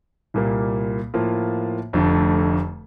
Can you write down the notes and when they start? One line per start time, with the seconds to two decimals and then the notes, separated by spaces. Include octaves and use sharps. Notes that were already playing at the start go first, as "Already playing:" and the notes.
0.34 C2 A#2 G3 A#3
1.14 A2 F3 A#3 F4
1.93 F1 F2 D3 A3